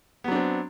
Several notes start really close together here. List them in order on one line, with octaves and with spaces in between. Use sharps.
B3 F#3 D4 C4